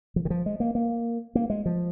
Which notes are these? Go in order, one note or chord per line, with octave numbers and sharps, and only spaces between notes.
F3
D#3
F3
G#3
A#3
A#3
A#3
G#3
F3